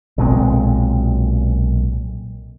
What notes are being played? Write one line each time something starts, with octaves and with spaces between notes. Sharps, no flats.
B1 A#2 G#3 C4